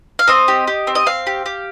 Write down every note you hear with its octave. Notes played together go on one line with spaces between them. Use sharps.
F5
C4 D#5
G4
G4
C4
D#5
C4 F5
G4
G4